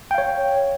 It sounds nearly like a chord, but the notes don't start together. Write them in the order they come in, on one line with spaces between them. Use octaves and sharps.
G5 F5 C#5